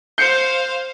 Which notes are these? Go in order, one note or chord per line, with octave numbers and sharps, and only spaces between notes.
C5 F5 G6 C7 C#7